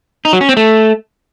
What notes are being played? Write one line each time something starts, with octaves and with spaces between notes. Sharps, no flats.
D#4
F#3
C#4
C4
A3